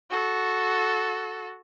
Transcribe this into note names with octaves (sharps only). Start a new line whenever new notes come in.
F#4 A4